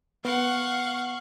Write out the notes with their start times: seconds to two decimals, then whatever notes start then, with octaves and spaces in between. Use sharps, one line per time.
0.25 B3 F5 F#5 C#6